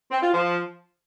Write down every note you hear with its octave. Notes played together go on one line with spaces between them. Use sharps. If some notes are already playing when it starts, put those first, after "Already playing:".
C4
F4
F3